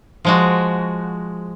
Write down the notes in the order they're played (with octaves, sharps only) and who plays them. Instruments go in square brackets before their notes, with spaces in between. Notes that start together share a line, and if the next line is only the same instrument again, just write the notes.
[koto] F3 G#3 F#4